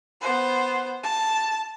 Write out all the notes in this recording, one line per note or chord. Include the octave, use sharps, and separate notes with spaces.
B3 C5
A5